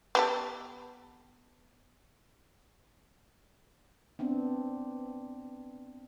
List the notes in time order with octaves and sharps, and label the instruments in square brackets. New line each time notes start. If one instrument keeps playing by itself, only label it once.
[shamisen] B3 G4 A4
[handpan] B3 C4 D4